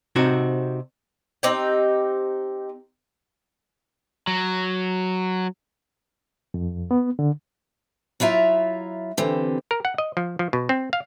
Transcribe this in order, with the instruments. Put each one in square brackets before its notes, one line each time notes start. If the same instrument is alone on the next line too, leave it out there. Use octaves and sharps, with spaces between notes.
[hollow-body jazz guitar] C3 C4 D#4 F#4
[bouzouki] C4 D#4 G4 G5
[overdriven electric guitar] F#3
[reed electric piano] F2
B3
D3
[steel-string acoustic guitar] F#3 E4 F4 E5 A#5
D3 E3 C4 G4
[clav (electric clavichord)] A#4
F#5
D#5
F3
F3
B2
C4
F5